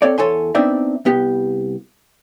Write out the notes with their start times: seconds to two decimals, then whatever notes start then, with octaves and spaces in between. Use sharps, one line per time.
0.02 C4 A4 C#5 D5
0.18 E2 A4 C#5 G#5 C6
0.55 B3 C4 D4 D#4 D5 E5
1.05 C2 B3 G4